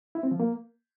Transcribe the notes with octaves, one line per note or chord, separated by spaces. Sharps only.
E4
C4
F3
A#3